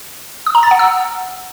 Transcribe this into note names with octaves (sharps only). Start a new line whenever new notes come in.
D#6
A#5
A6
F#5
E6